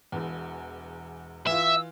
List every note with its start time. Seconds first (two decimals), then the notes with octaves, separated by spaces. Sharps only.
0.12 E1 E2
1.47 E3 F4 E5
1.62 E6